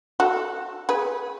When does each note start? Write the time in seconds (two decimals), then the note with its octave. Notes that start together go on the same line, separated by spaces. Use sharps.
0.20 F#4 A4
0.89 G#4 B4